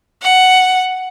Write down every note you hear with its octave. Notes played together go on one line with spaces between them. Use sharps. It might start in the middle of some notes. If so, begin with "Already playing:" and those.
F#5